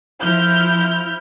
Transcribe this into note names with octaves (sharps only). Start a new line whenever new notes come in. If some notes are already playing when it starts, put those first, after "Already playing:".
F3 E4 F6 G6